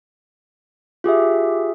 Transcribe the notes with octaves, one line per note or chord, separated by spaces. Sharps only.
F4 G4 G#4 E5